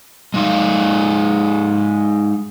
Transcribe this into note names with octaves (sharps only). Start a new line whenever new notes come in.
G#3 D#4 F5